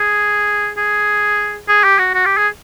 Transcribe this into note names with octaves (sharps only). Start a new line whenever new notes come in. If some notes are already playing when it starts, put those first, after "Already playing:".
Already playing: G#4
G#4
G#4
G4
F#4
F#4
G4
G#4